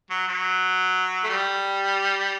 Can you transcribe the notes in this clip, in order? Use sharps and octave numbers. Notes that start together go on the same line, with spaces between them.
F#3
F#3
A3
G3